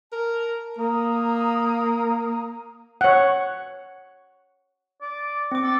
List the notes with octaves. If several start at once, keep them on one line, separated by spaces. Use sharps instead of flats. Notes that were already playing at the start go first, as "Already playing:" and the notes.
A#4 A5
A#3 A#5 D#6
C#5 F#5
D5
C4 D6
A4